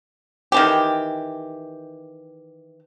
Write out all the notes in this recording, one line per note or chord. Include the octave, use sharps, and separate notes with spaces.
D#3 E3 G4